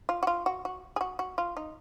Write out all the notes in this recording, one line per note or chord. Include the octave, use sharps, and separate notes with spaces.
F4
F#4
F4
F#4
F#4
G#4
F#4
F#4
F4
D#4